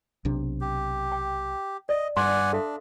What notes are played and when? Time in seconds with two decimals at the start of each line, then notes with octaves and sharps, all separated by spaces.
0.25 B1 C3 D4
0.61 G4
1.12 G5
1.89 D5 D#5
2.17 G2 D5 F#5 G#5 C6
2.53 D4 A4 E5 F5